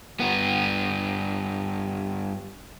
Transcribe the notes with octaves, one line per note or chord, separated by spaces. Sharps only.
G2 B3